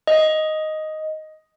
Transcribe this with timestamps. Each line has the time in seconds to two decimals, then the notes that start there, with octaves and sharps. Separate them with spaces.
0.07 D#5